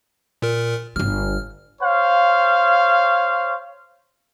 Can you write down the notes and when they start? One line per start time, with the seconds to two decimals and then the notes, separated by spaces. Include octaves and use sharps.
0.42 A#2 A#4
0.96 G1 D3 F6
1.82 C5 C#5 F5